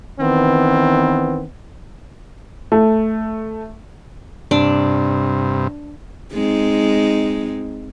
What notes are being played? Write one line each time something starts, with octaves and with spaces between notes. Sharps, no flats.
D#3 E3 B3 C4
A3
G2 C3 D4
G#3 C4 D#4